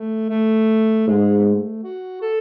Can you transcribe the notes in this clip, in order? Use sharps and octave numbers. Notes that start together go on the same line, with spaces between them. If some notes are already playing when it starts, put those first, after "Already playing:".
Already playing: A3
A3
G#2 G#3
B3
A3
F#4
A4